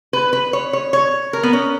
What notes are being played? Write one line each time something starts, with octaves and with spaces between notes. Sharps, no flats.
B4
B4
C#5
C#5
C#5
A#4
B3
C#4